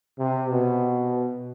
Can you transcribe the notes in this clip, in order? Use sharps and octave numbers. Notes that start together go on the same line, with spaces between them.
C3
B2